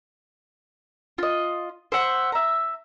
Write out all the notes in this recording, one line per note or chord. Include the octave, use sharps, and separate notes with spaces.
F4 D#5
C5 E5 F#5
E5 A#5